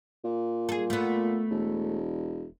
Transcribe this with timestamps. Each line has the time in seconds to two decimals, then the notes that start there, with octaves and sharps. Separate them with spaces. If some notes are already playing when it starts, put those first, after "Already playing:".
0.24 A#2
0.69 G#4 A4
0.90 A3 B3
1.51 E1